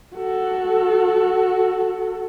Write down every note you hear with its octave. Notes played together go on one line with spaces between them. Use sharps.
F#4 A4